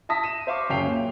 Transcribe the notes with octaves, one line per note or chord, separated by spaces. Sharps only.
E5 A5 D#6 A#6 B6
D#7 E7
C5 E5 F5 C#6 D6
F#1 F#2 C#3 G5 C7 F7
A#2